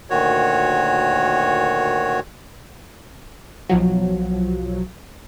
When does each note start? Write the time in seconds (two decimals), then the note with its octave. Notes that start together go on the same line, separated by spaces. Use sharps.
0.10 D2 A#2 D#3 F#4 C#5
3.69 B1 F3 F#3